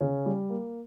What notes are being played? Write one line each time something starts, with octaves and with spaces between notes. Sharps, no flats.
C#3 C#4
G3
A#3